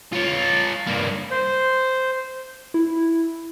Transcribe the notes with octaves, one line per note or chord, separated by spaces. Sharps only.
F4 C#5
G2 A#3
C5
E4